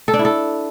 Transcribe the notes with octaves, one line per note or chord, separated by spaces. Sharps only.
A4
D4
E4
A4